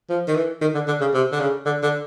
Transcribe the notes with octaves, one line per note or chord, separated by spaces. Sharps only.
F3
D#3
E3
D#3
D3
D3
C#3
C3
D3
C#3
D3
D3